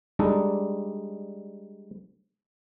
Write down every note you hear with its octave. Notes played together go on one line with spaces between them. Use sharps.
G3 G#3 D4 D#4 A4